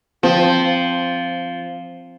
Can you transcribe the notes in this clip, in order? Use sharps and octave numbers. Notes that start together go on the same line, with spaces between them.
F3 C4